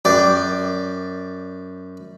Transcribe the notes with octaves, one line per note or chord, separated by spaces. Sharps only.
F#2 D5 G5